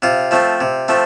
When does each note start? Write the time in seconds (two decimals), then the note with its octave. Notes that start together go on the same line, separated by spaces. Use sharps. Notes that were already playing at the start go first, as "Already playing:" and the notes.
0.02 C3 F4
0.31 F3 A3 C4
0.61 C3
0.88 F3 A3 C4